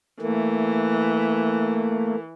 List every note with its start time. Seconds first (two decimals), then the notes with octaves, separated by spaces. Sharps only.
0.22 E3 A3 A#3